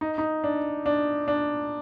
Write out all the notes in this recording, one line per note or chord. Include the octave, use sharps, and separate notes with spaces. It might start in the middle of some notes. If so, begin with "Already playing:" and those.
D#4
D#4
D4
D4
D4